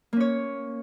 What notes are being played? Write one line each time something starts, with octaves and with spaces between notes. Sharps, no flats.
A#3 C#4 C#5